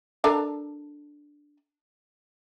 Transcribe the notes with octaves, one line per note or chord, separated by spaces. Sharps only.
D4 A4 A#4